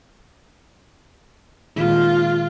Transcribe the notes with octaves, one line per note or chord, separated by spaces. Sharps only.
A#2 D#3 G#3 F4